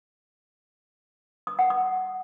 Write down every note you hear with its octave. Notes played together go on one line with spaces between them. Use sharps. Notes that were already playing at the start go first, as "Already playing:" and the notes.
D#6
F#5
D#6